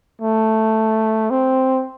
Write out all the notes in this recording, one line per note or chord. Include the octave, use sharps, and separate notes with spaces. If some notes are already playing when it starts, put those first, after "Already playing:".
A3
C4